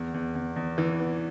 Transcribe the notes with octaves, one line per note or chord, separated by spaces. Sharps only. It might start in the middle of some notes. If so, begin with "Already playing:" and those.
Already playing: E2
E2
E2
E2
E3
B3